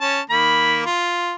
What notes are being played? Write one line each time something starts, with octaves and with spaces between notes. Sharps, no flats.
C#4 A5
D#3 A#3 B5
F4